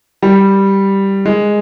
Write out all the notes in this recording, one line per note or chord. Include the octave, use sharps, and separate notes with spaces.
G3
G#3